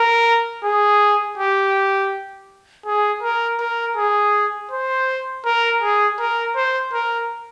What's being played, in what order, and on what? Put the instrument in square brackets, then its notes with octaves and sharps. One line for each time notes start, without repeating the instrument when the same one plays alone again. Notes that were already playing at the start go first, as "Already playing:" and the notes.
Already playing: [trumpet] A#4
G#4
G4
G#4
A#4
A#4
G#4
C5
A#4
G#4
A#4
C5
A#4